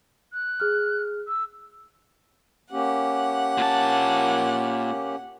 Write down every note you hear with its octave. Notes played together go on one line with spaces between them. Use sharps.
F#6
G#4 F6
E6
A#3 C#4 G4 F#5
A#2 A5